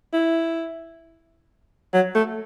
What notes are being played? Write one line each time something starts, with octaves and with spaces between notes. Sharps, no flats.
E4
F#3
A3